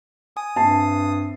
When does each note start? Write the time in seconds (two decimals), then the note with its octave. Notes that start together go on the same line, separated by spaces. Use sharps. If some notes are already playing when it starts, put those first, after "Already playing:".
0.37 G#5 D#6
0.56 G2 C4 E5 A5 C7